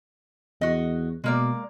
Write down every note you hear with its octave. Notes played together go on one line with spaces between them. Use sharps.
E2 F#4 D#5
B2 G#3 A#3 D5